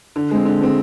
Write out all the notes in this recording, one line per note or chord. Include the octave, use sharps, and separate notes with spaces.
D3
G#3 C4
D3
G#3 C4